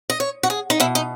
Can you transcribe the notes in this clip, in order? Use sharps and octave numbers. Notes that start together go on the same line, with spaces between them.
D#5
C#5
F#4
G#4
D#4
B2 E4
D#4